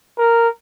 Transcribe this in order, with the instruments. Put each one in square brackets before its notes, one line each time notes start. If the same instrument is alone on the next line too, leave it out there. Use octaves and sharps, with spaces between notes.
[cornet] A#4